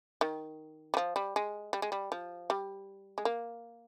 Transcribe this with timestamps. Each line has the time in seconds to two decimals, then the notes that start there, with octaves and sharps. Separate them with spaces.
0.21 D#3
0.94 G3
0.97 F3
1.16 G3
1.36 G#3
1.73 G3
1.82 G#3
1.92 G3
2.12 F3
2.50 G3
3.18 G#3
3.25 A#3